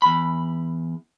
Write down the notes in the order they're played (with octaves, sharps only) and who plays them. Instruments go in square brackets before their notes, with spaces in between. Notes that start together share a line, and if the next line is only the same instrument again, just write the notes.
[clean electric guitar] E2 B5